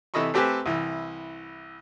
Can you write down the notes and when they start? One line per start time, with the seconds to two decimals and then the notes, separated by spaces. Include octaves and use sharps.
0.14 C3 E3 A4 D#5 B5 C#6
0.34 A3 C4 G4 A4 B4 G#5
0.66 C2 E3